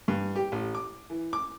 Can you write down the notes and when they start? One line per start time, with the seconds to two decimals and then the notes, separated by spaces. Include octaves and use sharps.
0.08 G2
0.36 G4
0.52 A1
0.75 D6
1.10 E3
1.33 D6